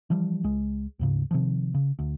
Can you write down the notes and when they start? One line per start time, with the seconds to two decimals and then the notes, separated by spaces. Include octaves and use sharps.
0.10 E3 F3 G3
0.44 C#2 G#3
0.99 D2 G#2 C#3
1.31 C3 D#3 F3
1.74 C#3
1.99 D2